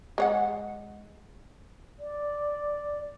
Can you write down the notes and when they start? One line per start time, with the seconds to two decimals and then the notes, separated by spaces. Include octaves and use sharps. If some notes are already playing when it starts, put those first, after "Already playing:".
0.18 G#3 C#5 F#5
2.00 D5